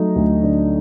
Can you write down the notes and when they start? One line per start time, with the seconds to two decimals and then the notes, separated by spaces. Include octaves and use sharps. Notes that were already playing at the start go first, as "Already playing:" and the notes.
Already playing: F#3 A3 D#4
0.16 D2
0.44 D3